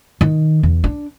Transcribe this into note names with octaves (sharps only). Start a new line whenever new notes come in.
D#3
E2
D4